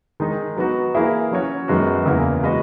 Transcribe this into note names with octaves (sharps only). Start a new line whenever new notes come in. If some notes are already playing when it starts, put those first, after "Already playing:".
D#3 G#3 D#4
F#3 B3 D#4 F#4
E3 A#3 E4 G#4
F#3 C#4 F#4 C#5
F#2 D#3 G#3 B3 F#4
E2 C#3 E3 A#3
G#3 B3 F#4 B4 D#5